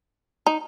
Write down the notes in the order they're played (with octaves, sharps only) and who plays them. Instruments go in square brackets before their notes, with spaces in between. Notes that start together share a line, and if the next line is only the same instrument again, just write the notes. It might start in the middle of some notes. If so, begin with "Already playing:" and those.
[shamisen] D#4